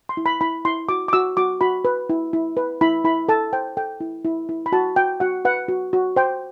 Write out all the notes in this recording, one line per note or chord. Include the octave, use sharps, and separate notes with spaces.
C6
E4
B5
E4 B5
E4 C6
F#4 D6
D6
F#4 E6
F#4 D6
F#4 B5
B4
E4
E4
B4
E4 B5
E4 B5
A4 A5
C5 G5
A4 G5
E4
E4
E4
B5
F#4 A5
F#4 G5
F#4 F#5
B4 F#5
F#4
F#4
C5 G5